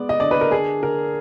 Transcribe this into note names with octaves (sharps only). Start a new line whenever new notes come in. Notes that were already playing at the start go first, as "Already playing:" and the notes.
Already playing: G#3 B3 D5
D#5
D3 D5
B4
A#4
D4 G#4
D3 A#4